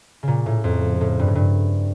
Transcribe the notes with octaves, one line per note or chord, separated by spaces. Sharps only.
A#2 C#3
A2
F2
A2
G2
A2
G2